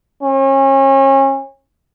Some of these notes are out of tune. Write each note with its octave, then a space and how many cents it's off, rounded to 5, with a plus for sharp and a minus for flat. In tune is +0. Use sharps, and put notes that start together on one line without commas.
C#4 -35